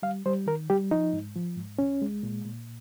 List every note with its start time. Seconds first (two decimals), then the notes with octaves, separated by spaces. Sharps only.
0.03 G3 F5
0.26 G3 C5
0.47 D#3 A#4
0.70 G3 G4
0.91 F3 D#4
1.13 G#2
1.36 F3
1.57 G#2
1.79 C2 C#4
2.02 G#3
2.23 A#2
2.45 A#2